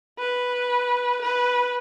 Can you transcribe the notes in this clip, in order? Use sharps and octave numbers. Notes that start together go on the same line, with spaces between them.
B4
B4